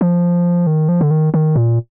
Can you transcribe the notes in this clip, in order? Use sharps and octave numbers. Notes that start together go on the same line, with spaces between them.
F3
D#3
F3
D3
D#3
D#3
A#2